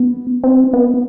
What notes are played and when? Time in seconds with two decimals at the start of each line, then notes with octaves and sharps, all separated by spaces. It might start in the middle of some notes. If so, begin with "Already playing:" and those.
Already playing: B3
0.44 C4
0.73 B3